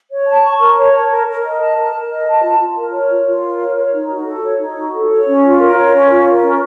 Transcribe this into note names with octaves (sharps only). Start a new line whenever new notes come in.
C#5
A5
C#6
A#4
C#5
A5
A#4
A#4
D#5
A5
A#4
A#4
D#5
A5
F4
F4
A#4
C#5
F4
F4
A#4
C#5
C#5
D#4
F#4
A4
C#5
D#4
F#4
A4
C#5
C#4
F4
A#4
C#5
C#4
F4
A#4
C#4